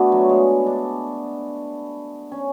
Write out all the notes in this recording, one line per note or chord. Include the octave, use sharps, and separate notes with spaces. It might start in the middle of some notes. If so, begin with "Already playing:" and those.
Already playing: A3 B3 D4 F#4
F#3
G#3
D4
C#4